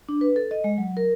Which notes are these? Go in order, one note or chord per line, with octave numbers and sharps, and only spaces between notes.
D4
B4
A4
D#5
G#3
F#3
A#4